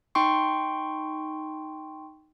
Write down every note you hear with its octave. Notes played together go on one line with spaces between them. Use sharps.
D#4 G5 C6 C#6